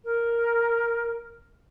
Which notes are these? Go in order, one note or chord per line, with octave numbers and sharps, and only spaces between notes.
A#4